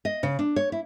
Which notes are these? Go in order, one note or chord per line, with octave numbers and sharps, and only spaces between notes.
D#5
C#3
D4
C#5
E4